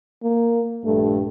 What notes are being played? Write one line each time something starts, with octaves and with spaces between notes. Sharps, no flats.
A#3
A#1 G2 A3